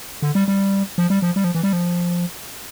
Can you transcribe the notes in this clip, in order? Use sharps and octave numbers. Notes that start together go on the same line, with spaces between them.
D3
G3
G3
F3
G3
F3
G3
F3
E3
G3
F3